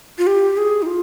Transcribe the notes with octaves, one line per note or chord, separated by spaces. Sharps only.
F4
G4
G#4
D#4
F4